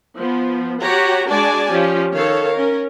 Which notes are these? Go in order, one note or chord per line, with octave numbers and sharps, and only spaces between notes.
F3 B3
F#4 G4 C#5 F#5 A#5
G#3 D4 F#4 D5 G#5 A5
F3 C#4 G4
D#3 A4 C#5 F5
C#4 A#4